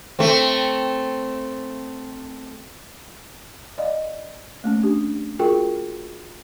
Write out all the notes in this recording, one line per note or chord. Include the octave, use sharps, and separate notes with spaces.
A3 C4
D5 D#5 F5
A3 A#3 C#4
D4 G4
F4 F#4 G#4 A#4 G5